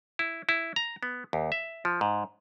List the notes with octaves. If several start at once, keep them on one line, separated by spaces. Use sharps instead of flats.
E4
E4
A#5
B3
D#2
E5
F3
G#2